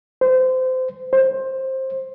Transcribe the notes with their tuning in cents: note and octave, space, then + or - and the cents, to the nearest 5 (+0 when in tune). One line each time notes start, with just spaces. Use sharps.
C5 -25
C5 +15